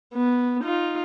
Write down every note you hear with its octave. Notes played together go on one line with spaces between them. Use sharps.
B3
D#4 F4